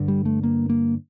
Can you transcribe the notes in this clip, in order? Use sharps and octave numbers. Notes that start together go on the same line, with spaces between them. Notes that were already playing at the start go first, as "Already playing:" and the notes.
Already playing: G2 D3
G3
A3
A#3
A#3